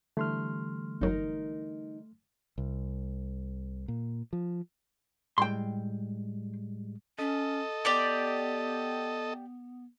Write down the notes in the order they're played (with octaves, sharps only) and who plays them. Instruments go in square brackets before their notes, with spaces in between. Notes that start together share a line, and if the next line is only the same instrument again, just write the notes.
[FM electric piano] D3 E3 G3 [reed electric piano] A3 C6 F6
[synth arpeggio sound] G1 F#3 [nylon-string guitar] D#4 A#4
[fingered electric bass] C2
A#2
F3
[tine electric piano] A2 G3 G#3 [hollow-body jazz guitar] G5 C6
[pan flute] C#4 [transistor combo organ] A4 D#5
[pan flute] B3 [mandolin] G4 D5 G5